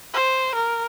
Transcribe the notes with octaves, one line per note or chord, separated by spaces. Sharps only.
C5
A#4